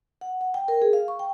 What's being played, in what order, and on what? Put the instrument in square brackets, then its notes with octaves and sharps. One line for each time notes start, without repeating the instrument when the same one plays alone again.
[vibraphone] F#5
F#5
G5
A#4
G#4
F5
C#6
G5